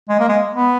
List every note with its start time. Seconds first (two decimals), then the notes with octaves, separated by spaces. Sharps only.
0.09 G#3
0.20 A#3
0.29 G#3
0.54 B3